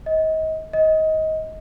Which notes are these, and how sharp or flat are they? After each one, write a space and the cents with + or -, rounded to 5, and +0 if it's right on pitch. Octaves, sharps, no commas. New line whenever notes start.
D#5 +30
D#5 +20